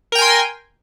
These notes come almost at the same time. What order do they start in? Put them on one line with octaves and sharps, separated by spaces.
A#4 G5 G#5 C6